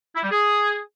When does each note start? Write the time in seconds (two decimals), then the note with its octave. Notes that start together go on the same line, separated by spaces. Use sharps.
0.15 E4
0.23 G3
0.31 G#4